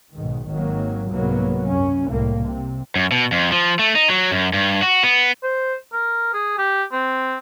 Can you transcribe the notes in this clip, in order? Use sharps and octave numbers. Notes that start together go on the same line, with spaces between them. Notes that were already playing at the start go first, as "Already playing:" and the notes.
B1 G#2 D#3
G#1 D#3 F#3 A#3
C2 G#2 F#3 A#3 B3
F#2 C#4
C2 A2 A#3
C3
F#2
B2
F2
F3
A3
D#4
F#3
F#2
G2
F#4
B3
C5
A#4
G#4
G4
C4